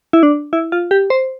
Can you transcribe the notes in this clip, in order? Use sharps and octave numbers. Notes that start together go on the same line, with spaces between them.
E4
D4
E4
F4
G4
C5